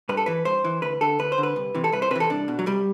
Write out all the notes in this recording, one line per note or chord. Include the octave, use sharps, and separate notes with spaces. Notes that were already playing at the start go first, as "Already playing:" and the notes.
G2 B4
A4
E3 B4
G2 C5
E3
D2 B4
D3 A4
D2 B4
C5
D3
B4
C2
C3 E3
A4
C2 B4
C5
C3 E3 A4 B4
C2 D4
B2
F#3
C2 G3